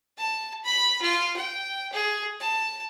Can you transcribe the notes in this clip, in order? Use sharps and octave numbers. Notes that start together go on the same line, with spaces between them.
A5
B5
F4
G5
G#4
A5